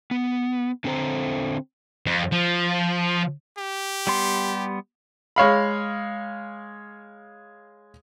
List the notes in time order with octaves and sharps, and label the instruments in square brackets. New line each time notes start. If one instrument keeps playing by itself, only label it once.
[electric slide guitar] B3
D3 C4 A4 C5 A#5
[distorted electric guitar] F2
F3
[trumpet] G4
[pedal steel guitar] G3 B3 C6
[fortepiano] G#3 C#5 F5 B5